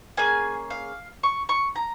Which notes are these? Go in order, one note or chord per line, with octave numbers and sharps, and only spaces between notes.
A#3 C#4 G#4 G#5
F5
C#6
C#6
A#5